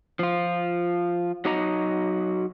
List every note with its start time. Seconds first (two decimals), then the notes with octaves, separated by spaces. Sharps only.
0.19 F3 F4
1.45 F#3 D#4 F#4 D#5 A#5